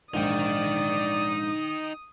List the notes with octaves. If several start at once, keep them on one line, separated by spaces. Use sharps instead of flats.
A#1 G#2 D#4 D5 G5 D#6